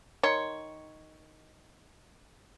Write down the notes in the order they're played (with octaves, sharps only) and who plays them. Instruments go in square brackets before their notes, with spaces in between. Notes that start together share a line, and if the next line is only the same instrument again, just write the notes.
[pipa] D#3 C#5 C6